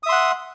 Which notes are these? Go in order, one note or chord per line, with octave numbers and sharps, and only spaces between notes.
E5 F#5 C6 D#6